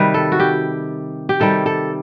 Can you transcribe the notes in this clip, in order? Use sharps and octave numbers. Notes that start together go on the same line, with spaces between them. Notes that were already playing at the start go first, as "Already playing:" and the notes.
Already playing: C3 D#3 G3 B4
A4
F#4
G4
G4
C3 D#3 G3 A4
A4